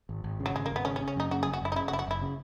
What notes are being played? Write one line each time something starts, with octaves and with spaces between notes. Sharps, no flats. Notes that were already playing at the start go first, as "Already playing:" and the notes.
G#1
G#1
C#3
F#3
G#1 G#3
G#1 A#3
B3
C#3 C#4
C#4
C#3
C#4
F#2 D#4
C#3 F#4
G#4
F#1
F#4
F#1 E4
D#4
C#3 E4
F#4
F#1 E4
F#4
F#1 E4
C#3